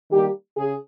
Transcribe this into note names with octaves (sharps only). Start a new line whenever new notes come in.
D#3 G3 A#3 G4
C#3 G#4